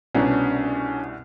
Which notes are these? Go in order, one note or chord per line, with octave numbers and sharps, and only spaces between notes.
C2 B2 C#4 D4